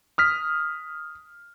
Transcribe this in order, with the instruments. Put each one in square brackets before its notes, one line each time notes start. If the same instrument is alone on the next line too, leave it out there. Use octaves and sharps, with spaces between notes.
[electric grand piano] D#6 F6 B6